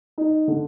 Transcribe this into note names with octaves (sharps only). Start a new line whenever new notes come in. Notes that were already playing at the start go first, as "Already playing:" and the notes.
D#4
D3